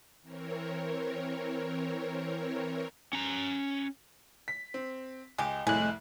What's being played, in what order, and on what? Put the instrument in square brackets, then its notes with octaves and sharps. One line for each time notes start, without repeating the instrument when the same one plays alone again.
[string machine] E3 C4 A#4 C#5
[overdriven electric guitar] C#4 A#5
[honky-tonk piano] B6
C4
[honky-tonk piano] C#2 [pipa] G#3 G4
[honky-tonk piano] C2 F2 [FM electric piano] A2 F#6 [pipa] G#3